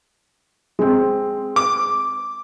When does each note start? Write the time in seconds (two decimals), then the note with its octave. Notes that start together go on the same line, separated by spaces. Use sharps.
0.79 G#3 C4
1.56 D6